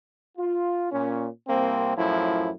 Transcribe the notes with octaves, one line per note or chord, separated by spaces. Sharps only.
F4
A#2 C#4
C2 A#3 C4
F#2 A2 F3 E4